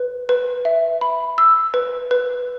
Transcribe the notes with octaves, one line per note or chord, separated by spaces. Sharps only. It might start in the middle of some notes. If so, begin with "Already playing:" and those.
Already playing: B4
B4
E5
B5
E6
B4
B4